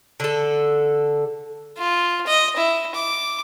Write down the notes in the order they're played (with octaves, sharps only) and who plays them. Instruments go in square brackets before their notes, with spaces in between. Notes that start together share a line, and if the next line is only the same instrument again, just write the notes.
[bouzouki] D3 A4
[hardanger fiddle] F4
D#5
E4
D6